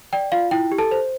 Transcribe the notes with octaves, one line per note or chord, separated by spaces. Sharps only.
D5 G5
F4 F5
E4 G5
G4
A4 A5
C5